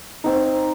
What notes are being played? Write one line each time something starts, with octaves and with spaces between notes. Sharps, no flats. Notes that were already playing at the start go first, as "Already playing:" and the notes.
C4 D#4